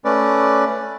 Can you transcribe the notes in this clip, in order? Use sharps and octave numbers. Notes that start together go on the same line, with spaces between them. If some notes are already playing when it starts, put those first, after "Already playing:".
A3 C#4 B4 D5